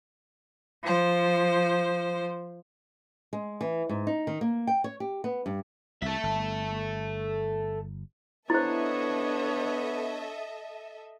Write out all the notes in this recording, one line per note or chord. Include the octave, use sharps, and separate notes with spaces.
F3 C5
G#3
E3
G#2
D#4
D#3
A#3
G5
C#5
G4
B3
G2
C2 A4 E5
G1
B3 D4 E4 A4 C5 C#5 D#5 E5